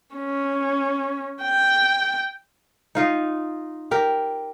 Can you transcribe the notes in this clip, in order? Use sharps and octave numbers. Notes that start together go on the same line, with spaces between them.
C#4
G5
D#4 F4 D#5
G4 A#4